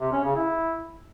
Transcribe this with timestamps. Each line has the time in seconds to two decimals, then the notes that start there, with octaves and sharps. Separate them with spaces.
0.01 C3
0.12 C#4
0.24 C#3
0.36 E4